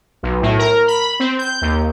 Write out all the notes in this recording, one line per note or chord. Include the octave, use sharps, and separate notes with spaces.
B1
A2
A#4
B5
C4
G6
D#2